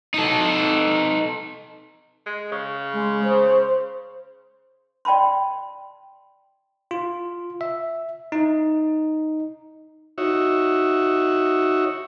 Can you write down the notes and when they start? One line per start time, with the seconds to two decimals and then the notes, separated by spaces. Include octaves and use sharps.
0.14 D#4 A4
2.26 G#3
2.52 C#3
2.93 G#3
3.24 C5
5.05 D5 G5 A5 B5 C6
6.91 F4
7.61 E5
8.32 D#4
10.18 D#4 F#4 C#5 E5